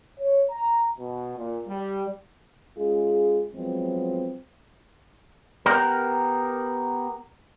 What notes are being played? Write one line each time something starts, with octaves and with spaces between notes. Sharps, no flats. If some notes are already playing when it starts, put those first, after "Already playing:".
C#5
A#5
B2
A#2
G3
G#3 C#4 F4 G#4
F3 F#3 G#3 B3 C4
B3 G4 A#4